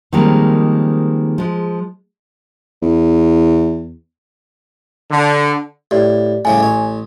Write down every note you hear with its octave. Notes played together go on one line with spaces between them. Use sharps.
D#3 F3 G3 G#3 A#3 C4
F3 G#3
E2
D3
A2 G4 D5
A2 C#3 G3 G#5
A1 C#5